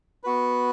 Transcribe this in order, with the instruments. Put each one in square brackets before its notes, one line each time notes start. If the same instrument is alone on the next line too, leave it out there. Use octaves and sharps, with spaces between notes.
[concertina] B3 F#4 B4